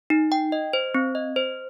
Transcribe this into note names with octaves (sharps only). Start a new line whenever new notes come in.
D#4
G5
D#5
C5
C4
D#5
C5